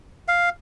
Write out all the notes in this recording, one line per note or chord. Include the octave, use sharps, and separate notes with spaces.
F5